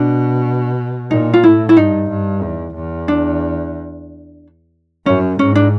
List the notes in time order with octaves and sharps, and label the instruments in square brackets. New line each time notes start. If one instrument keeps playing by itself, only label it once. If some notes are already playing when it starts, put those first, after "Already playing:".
Already playing: [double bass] B2 [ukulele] D4
[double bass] A#2 [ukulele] D#4
[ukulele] F4
[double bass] A2 [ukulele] E4
[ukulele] E4
[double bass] G2 [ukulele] D#4
[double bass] G2
E2
E2
[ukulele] D4
[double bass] F#2 [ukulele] C#4
[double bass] G#2 [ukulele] C#4
[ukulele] D4